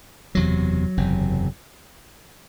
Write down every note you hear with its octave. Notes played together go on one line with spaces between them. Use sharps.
F#1 E2 C3 F#3
F#1 E2 C3